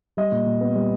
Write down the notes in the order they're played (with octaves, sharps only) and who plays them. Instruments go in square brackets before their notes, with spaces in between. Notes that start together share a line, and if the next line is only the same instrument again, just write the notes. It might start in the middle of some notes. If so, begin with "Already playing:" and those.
[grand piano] G3 D#5
A#2
A#2
B3
G3